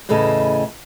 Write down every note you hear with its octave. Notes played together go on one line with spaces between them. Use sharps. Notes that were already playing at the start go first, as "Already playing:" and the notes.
E2 A2 C#3 A4 D#5